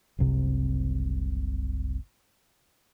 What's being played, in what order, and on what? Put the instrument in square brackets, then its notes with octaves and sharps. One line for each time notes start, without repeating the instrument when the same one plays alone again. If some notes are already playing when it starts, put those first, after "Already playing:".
[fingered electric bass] F#1 C2 C3